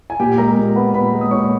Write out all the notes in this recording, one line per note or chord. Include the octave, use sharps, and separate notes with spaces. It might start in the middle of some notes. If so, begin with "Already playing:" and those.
G#5
A#2 G4 G5
G#3 A#4 A#5
A#2
B3 B4 B5
A#2 B4 B5
G#3
D#6
A#2 C#5 C#6